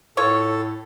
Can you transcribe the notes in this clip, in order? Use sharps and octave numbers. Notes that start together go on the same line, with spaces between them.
A2 F4 A4 C#5